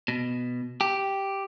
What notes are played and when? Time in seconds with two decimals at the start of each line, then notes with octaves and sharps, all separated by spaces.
0.08 B2
0.81 G4